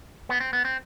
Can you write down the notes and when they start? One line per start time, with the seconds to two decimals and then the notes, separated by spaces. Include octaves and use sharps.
0.29 B3
0.40 C4
0.53 B3
0.65 C4